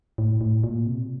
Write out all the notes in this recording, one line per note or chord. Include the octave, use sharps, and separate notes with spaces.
A2
A2
A#2
C3